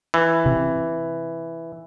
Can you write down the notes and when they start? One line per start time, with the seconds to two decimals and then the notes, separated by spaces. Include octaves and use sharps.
0.14 E3
0.46 C3